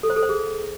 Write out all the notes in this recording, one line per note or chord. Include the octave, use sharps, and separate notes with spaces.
A4
C5
A4
C5
G#4